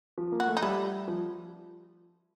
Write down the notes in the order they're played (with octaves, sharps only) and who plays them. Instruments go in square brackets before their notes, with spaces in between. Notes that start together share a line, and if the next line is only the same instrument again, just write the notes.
[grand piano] F3
A#3
[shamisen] F#4
[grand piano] A3
[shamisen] D#4
[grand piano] G3 [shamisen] E4
[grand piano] F3